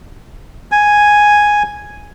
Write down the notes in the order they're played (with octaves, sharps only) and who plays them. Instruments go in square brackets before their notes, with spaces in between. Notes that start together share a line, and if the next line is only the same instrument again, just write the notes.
[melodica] G#5